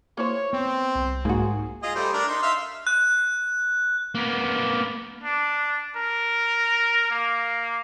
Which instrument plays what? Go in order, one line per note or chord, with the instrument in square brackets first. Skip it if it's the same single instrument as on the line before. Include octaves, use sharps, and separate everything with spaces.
[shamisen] A#3 E4 C5 [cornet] C#5
[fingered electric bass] B3 [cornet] C4
[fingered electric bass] C2
[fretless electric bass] G#2 [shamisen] A#3 F#4 [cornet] G#4
[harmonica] F4 G#4 D#5
G3 A3 C5
D4 A#4
D#4 C6
E5 F5 C6
[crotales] F#6
[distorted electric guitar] A#3 B3
[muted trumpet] D4
A#4
A#3